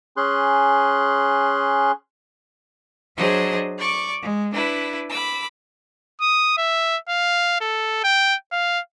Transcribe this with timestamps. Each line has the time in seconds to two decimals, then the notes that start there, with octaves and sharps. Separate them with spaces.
0.17 C#4 G#4 C6 F#6
3.17 F#3 D4 G#4 C5 D#5
3.79 D5 C#6 D6
4.21 G#3
4.54 D4 E4 B4
5.10 B5 D6 E6
6.21 D#6
6.57 E5
7.09 F5
7.61 A4
8.04 G5
8.52 F5